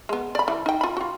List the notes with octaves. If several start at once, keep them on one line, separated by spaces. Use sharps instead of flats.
G#3 B3
D5 B5
E3
D#4 G5
F4 B5
F4 F#4